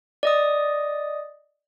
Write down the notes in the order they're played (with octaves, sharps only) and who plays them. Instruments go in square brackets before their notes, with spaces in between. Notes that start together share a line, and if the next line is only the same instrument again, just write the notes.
[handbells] D5 D#5 D#6